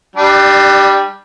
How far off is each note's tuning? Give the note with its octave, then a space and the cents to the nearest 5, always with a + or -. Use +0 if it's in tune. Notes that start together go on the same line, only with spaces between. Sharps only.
G3 +0 D4 +30